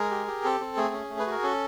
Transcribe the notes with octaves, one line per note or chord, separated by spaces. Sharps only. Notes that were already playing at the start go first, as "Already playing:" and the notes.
Already playing: G#3 G#4 A#4
G4
G4
C4 A4
C4
A3 G#4
C#4
A3
B4
F#4 A#4
C#4 A4